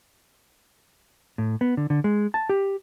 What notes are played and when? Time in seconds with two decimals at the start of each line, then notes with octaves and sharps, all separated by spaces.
1.38 A2
1.61 B3
1.77 D3
1.90 D3
2.04 G#3
2.34 A5
2.49 G4